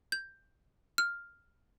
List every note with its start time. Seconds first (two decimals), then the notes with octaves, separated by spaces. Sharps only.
0.12 G6
0.98 F6